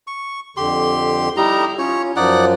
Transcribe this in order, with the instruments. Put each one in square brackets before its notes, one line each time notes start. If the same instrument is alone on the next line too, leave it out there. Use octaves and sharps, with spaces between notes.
[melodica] C#6
[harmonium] F2 D3 [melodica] G4 C6
[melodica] G3 D#4 A#5 [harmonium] E4 G4
[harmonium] C#4 F4 [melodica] C#5
[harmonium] F#2 F3 F4 [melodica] D#4 D5 F#5